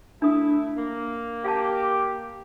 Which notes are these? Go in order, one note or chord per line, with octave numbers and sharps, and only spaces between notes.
A3 D4 E4 D#6
A#3
G4 F5 G5 A5